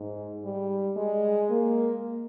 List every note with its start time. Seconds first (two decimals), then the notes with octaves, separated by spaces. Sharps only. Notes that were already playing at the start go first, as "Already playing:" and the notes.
Already playing: G#2
0.43 G3
0.96 G#3
1.50 A#3